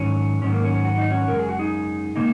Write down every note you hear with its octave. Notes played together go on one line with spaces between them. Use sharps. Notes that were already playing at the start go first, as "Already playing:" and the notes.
Already playing: G#2 D#3 F#3 C#4
G#2 D#3 F#3 C#4
A#3
C#4
F#4
D#4
C#4 F#4
F#2 C#3 G#3 A#4
G#4
F#4
D#4 G#4
C#3 G#3 A#3 D#4